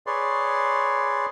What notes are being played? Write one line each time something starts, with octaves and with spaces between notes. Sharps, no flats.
G#4 B4 C#5 D5 C6